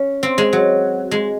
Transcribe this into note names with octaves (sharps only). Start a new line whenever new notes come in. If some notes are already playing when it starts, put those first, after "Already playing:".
Already playing: C#4
C4
G#3
F#3
G#3